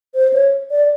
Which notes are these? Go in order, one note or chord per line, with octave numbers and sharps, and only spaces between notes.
C5
C#5
D5